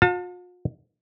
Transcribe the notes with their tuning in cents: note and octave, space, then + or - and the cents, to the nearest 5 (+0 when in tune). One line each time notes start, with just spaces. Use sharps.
F4 +45 A5 +25